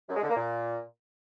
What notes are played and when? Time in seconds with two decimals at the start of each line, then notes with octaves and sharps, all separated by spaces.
0.09 F#2
0.16 G#3
0.23 D3
0.30 A#3
0.36 A#2